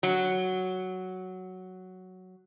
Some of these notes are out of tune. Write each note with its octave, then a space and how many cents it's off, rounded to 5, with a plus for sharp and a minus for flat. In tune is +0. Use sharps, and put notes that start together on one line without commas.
F#3 +5